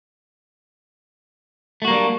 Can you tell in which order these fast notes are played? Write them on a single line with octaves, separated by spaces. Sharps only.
A3 F#4 A#3 G3 D4